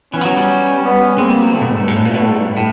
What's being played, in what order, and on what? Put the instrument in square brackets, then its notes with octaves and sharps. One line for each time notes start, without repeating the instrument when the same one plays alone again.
[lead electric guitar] E3 [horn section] B3 C#4
[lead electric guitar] F3
F#3
G3
[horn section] B3 C#4
[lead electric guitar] G#3 [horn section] A#3 C4
[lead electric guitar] G3
F#3
[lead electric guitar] D3 [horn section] G3 A3
[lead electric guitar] B2
G#2
G2
G#2
A2
A#2
B2
A2
G#2
G2
A2